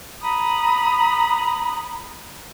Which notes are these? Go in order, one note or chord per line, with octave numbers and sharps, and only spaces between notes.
A#5 B5 D#6